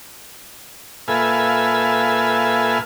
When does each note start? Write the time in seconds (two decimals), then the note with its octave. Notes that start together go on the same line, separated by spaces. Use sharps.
1.08 A#2 A4 B4 E5 F5 G#5